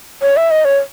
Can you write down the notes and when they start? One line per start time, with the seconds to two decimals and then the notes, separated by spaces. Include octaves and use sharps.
0.22 C#5
0.37 E5
0.51 D#5
0.65 C#5